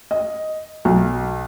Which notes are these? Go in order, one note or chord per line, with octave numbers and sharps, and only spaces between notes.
D#5
B1